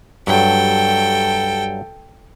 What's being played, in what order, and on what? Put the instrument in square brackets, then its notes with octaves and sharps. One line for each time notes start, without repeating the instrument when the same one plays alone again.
[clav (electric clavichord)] G2 F#3 [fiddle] A4 G5